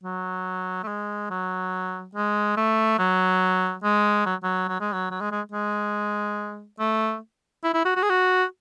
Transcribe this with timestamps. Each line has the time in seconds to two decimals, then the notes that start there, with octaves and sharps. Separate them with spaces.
0.03 F#3
0.83 A3
0.88 G#3
1.30 F#3
2.15 G#3
2.57 A3
2.99 F#3
3.83 G#3
4.26 F#3
4.43 F#3
4.68 F#3
4.80 G#3
4.93 F#3
5.11 F#3
5.21 G#3
5.32 G#3
5.52 G#3
6.79 A3
7.64 E4
7.74 E4
7.85 F#4
7.96 F#4
8.03 G#4
8.10 F#4